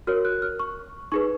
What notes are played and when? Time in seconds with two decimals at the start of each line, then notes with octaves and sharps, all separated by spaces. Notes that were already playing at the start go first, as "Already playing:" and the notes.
0.07 F#4 A#4 C#5 F6
0.25 F#6
0.42 F6
0.59 C#6
1.12 D#4 G#4 B4 C#6